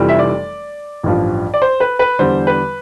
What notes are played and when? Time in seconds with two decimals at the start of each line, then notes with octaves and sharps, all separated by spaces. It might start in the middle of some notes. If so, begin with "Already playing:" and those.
Already playing: F1 F2 E3 G3
0.09 E5
0.19 D5
1.03 A1 G2 F3
1.54 D5
1.62 C5
1.80 B4
1.99 B4
2.19 E2 D3 G3 C5
2.47 B4